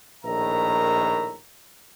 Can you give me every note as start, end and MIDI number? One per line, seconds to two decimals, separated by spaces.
0.24 1.36 34
0.24 1.36 45
0.24 1.36 51
0.24 1.36 70
0.24 1.36 76
0.24 1.36 82